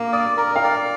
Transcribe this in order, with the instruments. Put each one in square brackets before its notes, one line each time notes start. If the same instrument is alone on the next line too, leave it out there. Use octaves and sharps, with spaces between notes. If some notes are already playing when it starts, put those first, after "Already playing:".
Already playing: [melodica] A#3 [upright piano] D6
[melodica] D5 [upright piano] D#6
[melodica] A#4 [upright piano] A#5
[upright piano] F5
[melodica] D5 [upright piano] G5